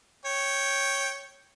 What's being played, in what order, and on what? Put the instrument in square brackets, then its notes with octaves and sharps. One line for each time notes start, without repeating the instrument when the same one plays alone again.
[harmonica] C#5 G5